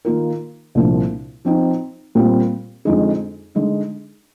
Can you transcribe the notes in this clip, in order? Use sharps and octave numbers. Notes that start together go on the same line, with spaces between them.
D#3 A#3 F4 A#4
C2 A#2 F3 A#3 D4
F3 C4 D#4
A#2 G3 C4 F4
F2 D3 G#3 D#4 G#4
D3 G#3 D#4